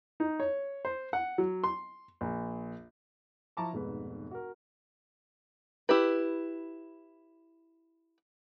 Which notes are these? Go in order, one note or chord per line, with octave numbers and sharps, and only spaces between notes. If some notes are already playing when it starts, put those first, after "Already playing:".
D#4
C#5
C5
F#5
F#3
C6
A#1
F3 E4 A5 A#5 C#6 D6
F1 G#2 B2 G#3 B4
F#4 A#4
E4 G4 B4